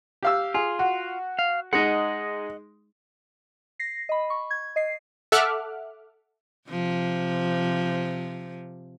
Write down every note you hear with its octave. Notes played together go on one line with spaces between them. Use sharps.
G4 F5 E6
F4 G#4
F#4
F5
G#3 D#4 D#5 F#5
A#6 C7
D#5 B5
C#6
G#6
D#5 C7
A4 E5 F#5 D6 F6 F#6
C3 F3